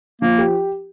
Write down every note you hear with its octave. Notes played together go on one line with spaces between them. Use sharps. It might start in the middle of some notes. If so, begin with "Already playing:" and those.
F3 A#3
G4